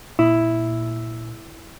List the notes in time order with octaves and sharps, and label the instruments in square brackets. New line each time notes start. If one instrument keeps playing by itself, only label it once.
[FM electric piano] A#2 [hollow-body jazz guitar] E4